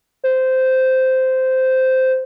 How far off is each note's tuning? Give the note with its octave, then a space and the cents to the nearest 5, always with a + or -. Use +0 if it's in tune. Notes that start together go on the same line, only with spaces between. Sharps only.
C5 -10